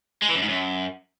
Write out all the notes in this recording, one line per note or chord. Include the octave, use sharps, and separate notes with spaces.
G#3
E3
F#2
G#2
F#2